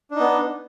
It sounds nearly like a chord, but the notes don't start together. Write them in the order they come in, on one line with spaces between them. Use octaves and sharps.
D4 D#4 B3